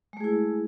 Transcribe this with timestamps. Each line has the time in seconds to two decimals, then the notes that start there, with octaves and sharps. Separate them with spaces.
0.13 G#3
0.17 A3
0.21 G#4
0.24 E4